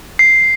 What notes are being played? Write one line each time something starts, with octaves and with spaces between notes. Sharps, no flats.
C7